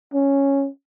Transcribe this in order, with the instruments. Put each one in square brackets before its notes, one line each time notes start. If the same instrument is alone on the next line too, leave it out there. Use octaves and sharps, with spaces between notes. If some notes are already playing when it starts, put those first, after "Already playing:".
[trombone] C#4